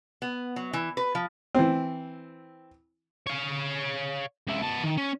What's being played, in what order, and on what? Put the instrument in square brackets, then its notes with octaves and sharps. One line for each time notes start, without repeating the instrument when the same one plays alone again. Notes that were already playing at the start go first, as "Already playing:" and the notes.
[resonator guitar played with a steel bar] B3
F#3
E3
B4
F3
[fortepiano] E3 C4
[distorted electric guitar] C#5 F5
C#2 E4
B3 A5
D#3
C#4